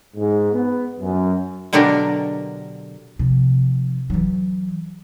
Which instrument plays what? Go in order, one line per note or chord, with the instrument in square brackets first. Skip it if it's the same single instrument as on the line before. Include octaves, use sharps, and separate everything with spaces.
[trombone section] G#2
B3
F#2
[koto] B2 D3 F#3 D4 G4 A#4
[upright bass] C3 F3
E3 F#3